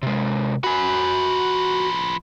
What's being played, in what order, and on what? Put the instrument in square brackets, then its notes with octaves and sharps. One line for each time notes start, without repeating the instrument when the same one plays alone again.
[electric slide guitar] C3 G#3
[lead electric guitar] F3 B4 [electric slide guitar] F#4 G#5